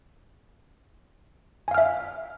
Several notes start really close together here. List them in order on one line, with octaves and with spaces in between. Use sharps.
G#5 F5 F6 E5